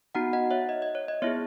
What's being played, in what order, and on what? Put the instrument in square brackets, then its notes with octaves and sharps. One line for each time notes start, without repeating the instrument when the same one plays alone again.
[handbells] B3 D#4 F#4 F#5 A#5
D#5 F#5
C#5 E5
D#5
D#5
C#5
D#5
B3 E4 G#4 C#5 E5